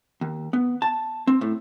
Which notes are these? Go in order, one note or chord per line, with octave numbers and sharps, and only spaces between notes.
D#2
B3
A5
C4
A2